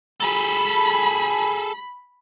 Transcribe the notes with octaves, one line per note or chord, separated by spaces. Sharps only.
G#4 A4 B5